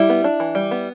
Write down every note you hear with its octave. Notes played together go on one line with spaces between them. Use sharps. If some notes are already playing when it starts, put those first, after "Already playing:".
Already playing: G3 E4
B3
D4
E3
G3
B3